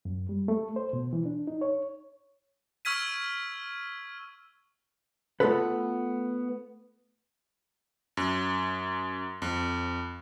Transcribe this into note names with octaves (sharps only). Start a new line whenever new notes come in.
F#2
G3
A3
C5
B2
E3
D4
D#4
C#5
C#6 E6 F6 G#6 B6 D#7
A3 B3 C#4 F4 A4 B4
F#2
F2